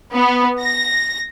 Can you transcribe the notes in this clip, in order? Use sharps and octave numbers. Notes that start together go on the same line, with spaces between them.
B3
A#6